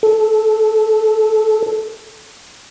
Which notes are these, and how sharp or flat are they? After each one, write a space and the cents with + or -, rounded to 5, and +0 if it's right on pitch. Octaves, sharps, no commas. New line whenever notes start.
A4 -15